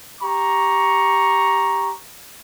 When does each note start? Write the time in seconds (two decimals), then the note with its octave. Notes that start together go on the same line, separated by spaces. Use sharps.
0.21 G4 A#5 C#6